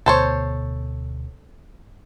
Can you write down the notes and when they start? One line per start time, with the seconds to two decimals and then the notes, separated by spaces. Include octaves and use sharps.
0.06 D2 B2 A4 C5 C#5